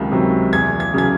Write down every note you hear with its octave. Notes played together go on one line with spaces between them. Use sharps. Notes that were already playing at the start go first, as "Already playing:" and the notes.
Already playing: C#2 C3 D#3 F#3
C3 D#3 F#3
E2 G#6
G#6
C#3 F#3 G#6